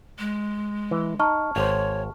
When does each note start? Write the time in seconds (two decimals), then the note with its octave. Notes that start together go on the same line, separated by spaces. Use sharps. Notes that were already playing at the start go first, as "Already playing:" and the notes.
0.19 G#3
0.91 E3
1.19 D#4 A5 C#6 F6
1.56 G#1 C5 C#5